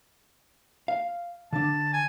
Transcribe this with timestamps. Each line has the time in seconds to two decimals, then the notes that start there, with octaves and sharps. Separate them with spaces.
0.88 F5
1.53 D3 D4 A5
1.93 G#5